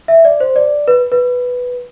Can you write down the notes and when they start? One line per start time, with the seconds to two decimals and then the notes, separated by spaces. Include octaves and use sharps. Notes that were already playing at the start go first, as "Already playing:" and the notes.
0.08 E5
0.25 D5
0.40 C5
0.56 D5
0.88 B4
1.12 B4